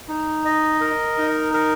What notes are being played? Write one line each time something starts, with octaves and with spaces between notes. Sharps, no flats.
D#4
D#5
A#4
D#4
A#4